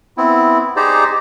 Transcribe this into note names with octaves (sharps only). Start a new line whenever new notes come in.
B3 C4 E4
D#4 G4 G#4 C5 D5 A#5